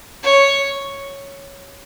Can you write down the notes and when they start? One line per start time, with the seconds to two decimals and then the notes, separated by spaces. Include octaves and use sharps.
0.23 C#5